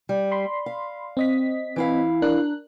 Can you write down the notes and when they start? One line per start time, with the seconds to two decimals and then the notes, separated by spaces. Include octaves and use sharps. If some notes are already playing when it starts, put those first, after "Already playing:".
0.09 G3
0.32 B5 C6
0.66 F5
1.17 C4 D#5 B6
1.76 E3 E4 F5
2.22 D4 A#4 F#6